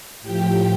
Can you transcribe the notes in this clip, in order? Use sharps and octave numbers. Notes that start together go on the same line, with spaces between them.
A2 F3 G4 G5